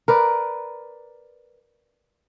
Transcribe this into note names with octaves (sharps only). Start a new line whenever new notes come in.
A#4 B4 D5